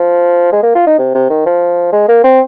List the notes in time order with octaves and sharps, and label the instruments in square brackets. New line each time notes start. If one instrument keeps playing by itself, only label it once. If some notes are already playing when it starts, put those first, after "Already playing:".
Already playing: [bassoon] F3
G#3
A#3
F4
D#4
C3
C3
D#3
F3
G#3
A#3
C4